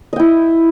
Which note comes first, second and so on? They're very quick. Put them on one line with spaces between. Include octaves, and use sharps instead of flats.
D#5 G5 E4